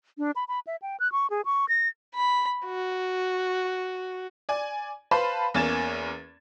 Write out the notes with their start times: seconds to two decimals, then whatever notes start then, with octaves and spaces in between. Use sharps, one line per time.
0.18 D4
0.36 B5
0.48 B5
0.67 E5
0.82 G5
1.00 F#6
1.12 C#6
1.30 G#4
1.45 C#6
1.69 A#6
2.15 B5
2.66 F#4
4.49 D5 G#5
5.11 B4 C5 F5 A5 B5
5.54 E2 A#3 C#4 G#6 A6 E7